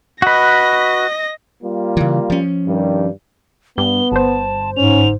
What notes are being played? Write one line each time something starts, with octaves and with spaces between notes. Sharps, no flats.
F#4 B4 D#5 A#6
G3 A#3 F4
C#3 E3
F3 C#4
G2 D#3 G3
G2 B3 G7
G1 C5 A5
G#2 C#4 F7